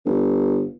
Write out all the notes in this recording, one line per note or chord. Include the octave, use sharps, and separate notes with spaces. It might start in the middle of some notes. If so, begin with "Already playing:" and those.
G1